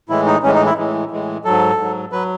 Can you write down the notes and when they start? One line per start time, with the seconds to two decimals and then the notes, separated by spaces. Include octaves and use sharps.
0.09 A2 E3 G#3 E4
0.26 D#4
0.43 A2 E3 G#3 C#4
0.55 D#4
0.66 E4
0.77 A2 E3 G#3
1.11 A2 E3 G#3
1.44 G#2 F#3 A4
1.78 G#2 F#3
2.12 F#3 B4